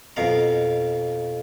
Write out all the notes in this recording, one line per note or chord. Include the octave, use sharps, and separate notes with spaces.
F2 B2 F5 A#5